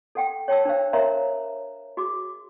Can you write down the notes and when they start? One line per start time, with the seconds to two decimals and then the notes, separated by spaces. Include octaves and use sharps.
0.15 A4 F#5 G5
0.48 C#5 G5 A5 E6
0.65 D4 C5 F5
0.93 A#4 C5 C#5 E5 F5 A#5
1.97 F#4 G#4 D6